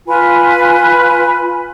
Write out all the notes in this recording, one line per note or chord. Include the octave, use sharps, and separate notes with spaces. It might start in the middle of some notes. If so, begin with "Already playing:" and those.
F4 B4 G#5 B5